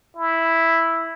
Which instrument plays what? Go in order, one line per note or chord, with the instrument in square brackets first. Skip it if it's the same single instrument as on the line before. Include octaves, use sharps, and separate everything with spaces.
[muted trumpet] E4